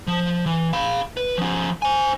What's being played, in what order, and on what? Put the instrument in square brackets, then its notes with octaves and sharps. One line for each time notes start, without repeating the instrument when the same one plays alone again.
[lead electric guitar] F3
E3
F5 B5
B4
F3 C#4
C5 G#5